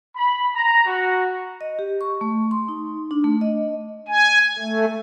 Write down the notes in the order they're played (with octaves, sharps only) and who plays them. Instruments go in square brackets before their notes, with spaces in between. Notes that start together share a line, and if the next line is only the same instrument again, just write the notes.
[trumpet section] B5
A#5
F#4
[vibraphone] D#5
G4
C#6
A3
C6
D#4
D4
A3
D#5
[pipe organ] G#5
A3